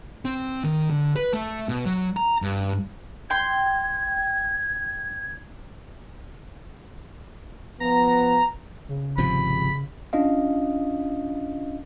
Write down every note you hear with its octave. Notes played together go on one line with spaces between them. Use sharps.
C4
D#3
D3
B4
A3
B2
F#3
A#5
G2
G5 C6 G#6
F3 B3 A#5
C#3
G#1 C3 F3 B5
C#4 D4 F4 D#5 F5